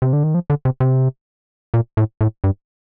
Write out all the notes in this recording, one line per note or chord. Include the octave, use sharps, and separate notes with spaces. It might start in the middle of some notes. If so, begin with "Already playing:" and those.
C3
D3
D#3
F3
D3
C3
C3
A#2
A2
A2
G2